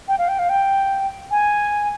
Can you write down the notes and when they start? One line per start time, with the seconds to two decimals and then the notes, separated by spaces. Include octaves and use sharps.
0.08 G5
0.19 F5
0.29 G5
0.39 F5
0.49 G5
1.31 G#5